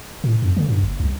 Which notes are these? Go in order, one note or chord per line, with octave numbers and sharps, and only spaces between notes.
A2
F2
D3
G2
F#1
C2